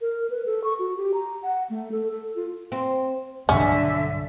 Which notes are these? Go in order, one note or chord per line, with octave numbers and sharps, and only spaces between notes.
A#4
B4
A4
C#6
F#4
G4
A#5
F#5
A3
A4
A4
F4
C4
B1 G2 D3 C#4 E5